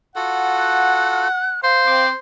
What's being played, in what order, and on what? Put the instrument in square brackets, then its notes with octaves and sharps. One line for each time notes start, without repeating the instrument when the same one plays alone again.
[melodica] F4 F#4 A4 [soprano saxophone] F#5
[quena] F#6
[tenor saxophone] C5 [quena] F5
[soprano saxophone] C4 [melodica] D6